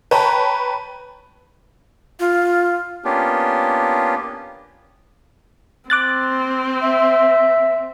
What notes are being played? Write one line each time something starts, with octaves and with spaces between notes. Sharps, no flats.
B4 C#5 G5 A5 A#5
F4
A#3 B3 C#4 D4 F4 G4
C4 D6 F#6 A6
E5